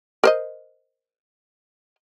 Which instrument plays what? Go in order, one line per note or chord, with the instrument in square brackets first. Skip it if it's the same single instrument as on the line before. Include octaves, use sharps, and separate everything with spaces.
[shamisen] A#4 C5 D#5